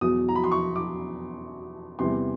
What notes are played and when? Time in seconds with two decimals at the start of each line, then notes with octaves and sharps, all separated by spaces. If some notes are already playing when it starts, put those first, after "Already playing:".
0.01 E2 B2 F#3 D#6
0.29 A#5
0.35 B5
0.44 C6
0.51 C#6
0.76 D6
1.99 E2 C3 E3 G3 C6